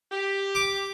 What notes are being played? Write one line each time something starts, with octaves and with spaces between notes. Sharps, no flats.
G4
D6